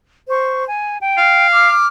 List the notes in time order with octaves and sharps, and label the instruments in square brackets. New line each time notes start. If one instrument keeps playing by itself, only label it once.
[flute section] C5 C#6
G#5
G5
[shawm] F5
[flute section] D6 F6